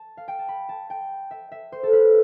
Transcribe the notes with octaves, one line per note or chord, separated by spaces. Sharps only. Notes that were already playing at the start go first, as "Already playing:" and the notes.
Already playing: A5
F5
G5
A5
B5
A5
G5
E5
E5
C5
A4
B4